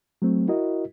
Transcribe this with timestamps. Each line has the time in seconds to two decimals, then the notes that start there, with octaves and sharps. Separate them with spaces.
0.22 F#3 A3 C4
0.48 E4 F#4 A#4 D#5